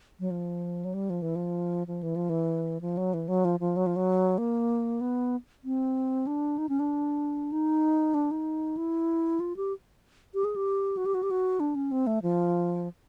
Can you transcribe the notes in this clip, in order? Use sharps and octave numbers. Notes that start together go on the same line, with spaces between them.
F#3
F3
F#3
G3
F3
E3
F3
F3
E3
F3
E3
F3
F#3
E3
F#3
F3
F3
F#3
F3
F#3
A#3
B3
C4
D4
D#4
C#4
D4
D#4
D4
D#4
E4
F4
G4
G4
G#4
G4
F#4
G4
F#4
G4
F#4
D4
C#4
C4
A3
F3